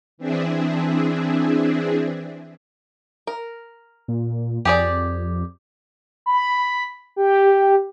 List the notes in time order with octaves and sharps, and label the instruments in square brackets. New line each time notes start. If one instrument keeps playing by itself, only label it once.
[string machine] E3 C4 D4 E4 G#4
[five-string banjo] A#4
[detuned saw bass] A#2
[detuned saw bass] F2 [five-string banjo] G4 G#4 D5
[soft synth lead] B5
G4